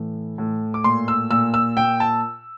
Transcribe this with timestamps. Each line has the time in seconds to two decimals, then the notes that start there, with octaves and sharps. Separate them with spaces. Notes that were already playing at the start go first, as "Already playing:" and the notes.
Already playing: A2 E3
0.38 A2
0.74 D6
0.84 A#2 C6
1.08 E6
1.31 A#2 E6
1.54 E6
1.77 A#2 G5
2.00 A5